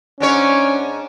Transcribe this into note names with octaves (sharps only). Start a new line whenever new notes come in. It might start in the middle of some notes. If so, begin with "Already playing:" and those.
G#2 C#4 D4 C#5